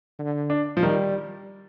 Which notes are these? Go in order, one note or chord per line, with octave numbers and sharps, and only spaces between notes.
D3
D4
F3
D#3 G3